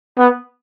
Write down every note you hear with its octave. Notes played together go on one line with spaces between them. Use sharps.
B3